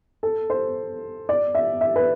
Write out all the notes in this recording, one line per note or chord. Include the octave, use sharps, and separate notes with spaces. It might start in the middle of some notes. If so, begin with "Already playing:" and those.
A4
C5
D5
E5
E5
B4